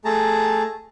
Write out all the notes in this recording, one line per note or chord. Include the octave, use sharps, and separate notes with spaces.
A3 G#4 A5 A#5